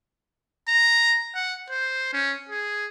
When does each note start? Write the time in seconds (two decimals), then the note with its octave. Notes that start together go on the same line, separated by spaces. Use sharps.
0.68 A#5
1.35 F#5
1.70 C5
2.13 C#4
2.49 G#4